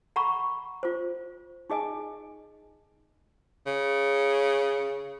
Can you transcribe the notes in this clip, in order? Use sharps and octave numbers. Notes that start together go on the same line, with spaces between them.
F#5 A#5 B5 C#6
F4 C5
D#4 G#4 D#5 G#5
C#3